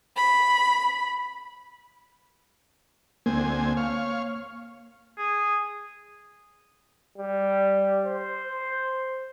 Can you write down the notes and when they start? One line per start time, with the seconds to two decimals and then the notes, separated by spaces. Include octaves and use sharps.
0.16 B5
3.26 D2 A#3 C4 G#5
3.77 C#5 F5
5.18 G#4
7.18 G3
8.06 C5